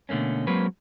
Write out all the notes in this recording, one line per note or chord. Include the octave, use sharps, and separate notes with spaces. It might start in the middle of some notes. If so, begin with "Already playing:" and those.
B2 D3 A3 A#3 C#4
F#3 G#3 A#3 C4 B4